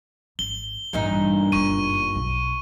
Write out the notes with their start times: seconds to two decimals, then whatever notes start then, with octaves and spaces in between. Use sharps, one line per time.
0.39 G#1 G7
0.93 A1 G2 A#2 E3 D#4
1.52 F#1 B3 C#6 D#7
2.15 B1